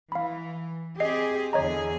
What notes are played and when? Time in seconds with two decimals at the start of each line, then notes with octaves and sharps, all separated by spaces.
0.12 E3 F5 B5
1.00 C4 G4 G#4 D#5 C7
1.53 E2 D3 G#4 C#5 D#5 A#5